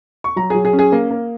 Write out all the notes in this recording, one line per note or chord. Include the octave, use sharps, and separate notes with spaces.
C#6
F#3 A#5
F#3 G#4
G#4
C#4
G#4
A#3
A#3